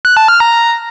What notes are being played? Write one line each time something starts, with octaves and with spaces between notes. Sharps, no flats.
F#6
A5
F6
A#5